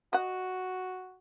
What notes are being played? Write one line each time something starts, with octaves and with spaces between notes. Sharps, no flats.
F#4 D#5 F#5